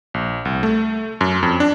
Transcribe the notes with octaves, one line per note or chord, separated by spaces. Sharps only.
A#1
C2
A3
F#2
F2
D4